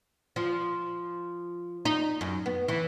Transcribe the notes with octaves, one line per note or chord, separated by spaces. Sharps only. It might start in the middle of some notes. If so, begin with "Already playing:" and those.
F3
D#4
F#2
B3
E3